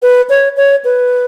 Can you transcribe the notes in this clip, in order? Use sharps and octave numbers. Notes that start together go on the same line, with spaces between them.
B4
C#5
C#5
B4